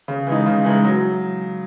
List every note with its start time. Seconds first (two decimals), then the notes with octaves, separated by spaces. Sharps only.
0.08 C#3
0.27 E3 G#3 D#4
0.46 C#3
0.65 E3 G#3 D#4
0.85 F#3